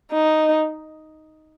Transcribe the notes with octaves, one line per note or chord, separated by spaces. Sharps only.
D#4